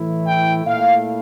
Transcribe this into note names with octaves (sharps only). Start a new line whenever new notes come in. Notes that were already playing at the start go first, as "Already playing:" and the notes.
Already playing: A2 E3 A3 E4
G5
A#2 A3 E4 F5